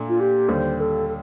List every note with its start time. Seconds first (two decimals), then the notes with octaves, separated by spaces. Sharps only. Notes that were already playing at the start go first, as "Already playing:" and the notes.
Already playing: A#2 A3 D4
0.09 F4
0.20 G4
0.48 D#2 D3 G3 C5
0.77 C5
0.80 A4
1.07 A4